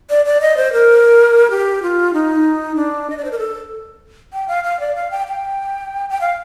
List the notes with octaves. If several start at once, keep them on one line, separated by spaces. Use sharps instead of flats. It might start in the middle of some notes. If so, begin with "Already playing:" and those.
D5
D5
D#5
C5
A#4
G4
F4
D#4
D4
D#5
D5
C5
A#4
A4
G5
F5
F5
D5
F5
G5
G5
G5
F5